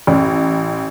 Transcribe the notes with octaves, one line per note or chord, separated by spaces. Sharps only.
A1